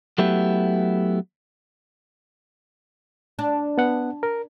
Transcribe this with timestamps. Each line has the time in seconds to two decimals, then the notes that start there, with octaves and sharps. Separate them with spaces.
0.18 F#3 A3 B3 E4 G4
3.39 D4
3.78 B3 F#5
4.23 A#4